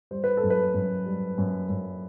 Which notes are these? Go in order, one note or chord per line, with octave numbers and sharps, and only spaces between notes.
G3 C5
B4
A4
F#2
B4
F#2
G3
F#2
F#2